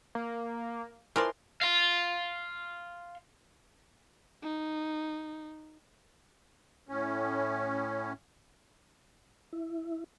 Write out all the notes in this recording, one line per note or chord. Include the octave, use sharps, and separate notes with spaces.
A#3
E3 F3 A#4 D5 C6
F5 C6
D#4
A2 C#4
E4